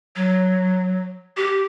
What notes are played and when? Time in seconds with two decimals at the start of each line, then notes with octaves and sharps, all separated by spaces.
0.16 F#3
1.37 G4